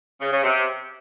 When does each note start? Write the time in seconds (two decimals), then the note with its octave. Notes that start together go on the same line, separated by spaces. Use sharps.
0.20 C#3
0.32 C#3
0.44 C3